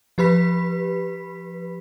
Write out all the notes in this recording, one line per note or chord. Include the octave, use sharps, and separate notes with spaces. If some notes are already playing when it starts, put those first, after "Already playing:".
F3 G4 B4 B5 B6